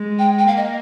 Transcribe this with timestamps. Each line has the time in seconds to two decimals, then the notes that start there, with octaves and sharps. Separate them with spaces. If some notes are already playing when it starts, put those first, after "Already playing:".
Already playing: G#3
0.19 G5
0.38 G5
0.47 A#3 F5
0.57 D#5